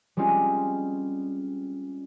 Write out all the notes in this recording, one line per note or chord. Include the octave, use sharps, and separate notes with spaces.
G3 G#3 C4 C#4 F4 G4